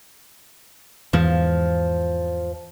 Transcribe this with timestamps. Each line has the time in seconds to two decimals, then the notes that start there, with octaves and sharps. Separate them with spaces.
1.13 E2 G#2 E3 F3